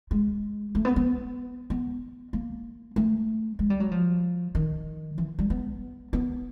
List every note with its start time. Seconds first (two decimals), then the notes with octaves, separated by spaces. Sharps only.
0.11 G#3
0.75 A3
0.85 B3
0.96 B3
1.70 B3
2.33 A#3
2.96 A3
3.59 G#3
3.70 G3
3.80 F#3
3.91 F3
4.55 D#3
5.18 E3
5.39 G3
5.50 B3
6.13 B3